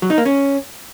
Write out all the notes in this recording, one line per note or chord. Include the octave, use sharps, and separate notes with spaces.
F#3
D#4
A#3
C#4